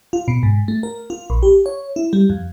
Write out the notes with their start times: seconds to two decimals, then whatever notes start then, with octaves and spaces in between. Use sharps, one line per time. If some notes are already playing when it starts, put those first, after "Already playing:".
0.13 F4
0.28 B2
0.43 G#2
0.68 A3
0.83 A#4
1.10 F4
1.30 A#1
1.43 G4
1.66 C#5
1.96 E4
2.13 G3
2.30 F2